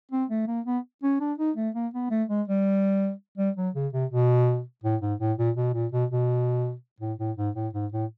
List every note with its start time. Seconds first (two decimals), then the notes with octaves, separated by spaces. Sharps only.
0.12 C4
0.30 A3
0.48 A#3
0.66 B3
1.03 C#4
1.20 D4
1.38 D#4
1.57 A3
1.75 A#3
1.94 B3
2.11 A3
2.29 G#3
2.48 G3
3.38 G3
3.57 F#3
3.75 C#3
3.93 C3
4.11 B2
4.84 A2
5.02 G#2
5.20 A2
5.38 A#2
5.57 B2
5.74 A#2
5.92 B2
6.10 B2
7.01 A2
7.19 A2
7.37 G#2
7.55 A2
7.74 G#2
7.92 A2